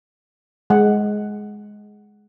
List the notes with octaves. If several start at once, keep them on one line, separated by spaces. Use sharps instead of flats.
G#3 F#5